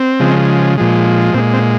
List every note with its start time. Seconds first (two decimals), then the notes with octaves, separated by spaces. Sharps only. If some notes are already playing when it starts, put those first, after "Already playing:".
Already playing: C4
0.20 C#3 F3 G#3
0.77 A#2 F3 G#3
1.34 A#2 C4
1.38 G#3
1.53 C4